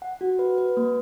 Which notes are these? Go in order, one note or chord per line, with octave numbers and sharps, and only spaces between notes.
F#5
F#4
B4
B4
A#3